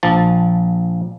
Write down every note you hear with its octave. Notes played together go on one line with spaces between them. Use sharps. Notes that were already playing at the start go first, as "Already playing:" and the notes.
A#1 F3 A5